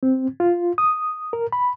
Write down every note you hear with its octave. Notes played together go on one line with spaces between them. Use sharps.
C4
F4
D#6
A#4
B5